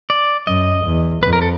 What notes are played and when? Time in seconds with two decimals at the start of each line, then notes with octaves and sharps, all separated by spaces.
0.10 D5
0.47 F#2 D#5
0.85 E2
1.23 F2 B4
1.33 A#4
1.42 A4